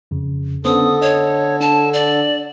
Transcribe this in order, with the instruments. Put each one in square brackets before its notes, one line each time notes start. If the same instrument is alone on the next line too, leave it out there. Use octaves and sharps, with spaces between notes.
[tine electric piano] F2 C#3
[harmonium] D3 A4 [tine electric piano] B3 C#4 C5 [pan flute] D#6
[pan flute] C#5 [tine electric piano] D#5
[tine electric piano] D4 [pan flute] A5
[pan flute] D5